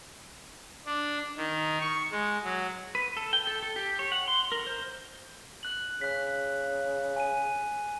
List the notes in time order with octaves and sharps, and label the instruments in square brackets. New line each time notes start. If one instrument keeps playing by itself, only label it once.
[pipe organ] D4
D#3
C#6
G#3
F#3
[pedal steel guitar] B4
A4
G5
A4
A4
G4
C#5
F#5
C6
A#4
C5
[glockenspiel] F#6 F#7
[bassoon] C#3 [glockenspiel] F#6 B6
[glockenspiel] G#5 D#7